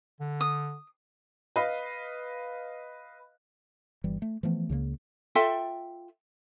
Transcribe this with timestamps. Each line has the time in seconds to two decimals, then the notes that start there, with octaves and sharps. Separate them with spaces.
0.20 D3
0.41 D#6
1.56 B4 D#5 F5
4.04 G1 E3 G3
4.22 A3
4.43 E3 F3 A3 B3
4.69 C#2 C#3 F3 A#3
5.35 F4 A4 E5 G5